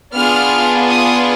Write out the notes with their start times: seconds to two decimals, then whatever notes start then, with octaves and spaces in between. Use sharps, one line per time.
0.14 B3 D4 F4 G#4 F6
0.88 D#6